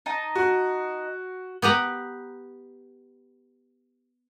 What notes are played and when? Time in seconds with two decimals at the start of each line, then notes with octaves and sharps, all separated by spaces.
0.06 D#4 D#5 A5
0.35 F#4
1.62 B3 G4 B4 A#5